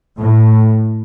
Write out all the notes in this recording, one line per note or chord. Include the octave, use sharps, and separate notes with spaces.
A2